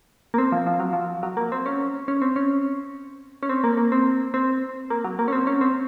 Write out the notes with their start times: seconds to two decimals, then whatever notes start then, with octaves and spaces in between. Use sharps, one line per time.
0.34 A#3
0.38 C4
0.52 F3
0.67 F3
0.80 F#3
0.93 F3
1.23 F#3
1.37 A#3
1.52 C4
1.66 C#4
2.08 C#4
2.22 C4
2.36 C#4
3.43 C#4
3.49 C4
3.64 A#3
3.77 A#3
3.92 C4
4.34 C4
4.90 A#3
5.04 F#3
5.19 A#3
5.28 C#4
5.32 C4
5.47 C#4
5.61 C4